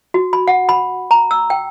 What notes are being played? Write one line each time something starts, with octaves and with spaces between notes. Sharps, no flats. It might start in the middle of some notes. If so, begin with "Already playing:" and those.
F#4
B5
F#5
B5
A#5
E6
G5